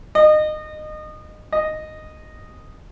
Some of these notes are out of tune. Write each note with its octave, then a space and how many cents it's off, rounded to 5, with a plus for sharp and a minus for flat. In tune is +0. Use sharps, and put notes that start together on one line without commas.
D#5 -25
D#5 -5